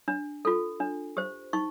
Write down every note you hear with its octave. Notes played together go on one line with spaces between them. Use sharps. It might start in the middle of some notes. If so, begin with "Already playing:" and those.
D4
F4 A4
D4
G4 C5
D#4 C#6